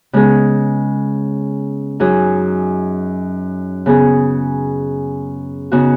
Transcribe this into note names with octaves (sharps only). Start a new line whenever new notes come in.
C#3 G#3 B3 G#4
F#2 F#3 D#4 G#4
C#3 B3 G#4
C#3 B3 D#4 F#4